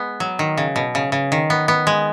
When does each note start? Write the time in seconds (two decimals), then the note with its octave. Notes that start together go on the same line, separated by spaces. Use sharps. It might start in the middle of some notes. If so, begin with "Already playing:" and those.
Already playing: G#3 B3
0.20 F#3
0.39 D#3
0.58 C#3
0.76 B2
0.95 C#3
1.12 C#3
1.32 D#3
1.50 B3
1.68 B3
1.87 G#3